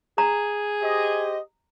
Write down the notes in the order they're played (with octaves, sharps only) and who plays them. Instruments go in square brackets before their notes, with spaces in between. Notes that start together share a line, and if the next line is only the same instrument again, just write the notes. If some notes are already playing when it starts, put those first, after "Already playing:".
[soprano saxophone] G#4 [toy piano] A#5
[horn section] G4 C5 D#5